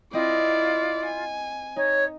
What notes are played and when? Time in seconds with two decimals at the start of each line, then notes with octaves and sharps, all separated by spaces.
0.13 C4 E4 F4 D5 D#5
1.06 G#5
1.76 D#4 C#5